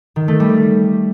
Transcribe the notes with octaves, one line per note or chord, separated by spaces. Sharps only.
D#3
A3
G3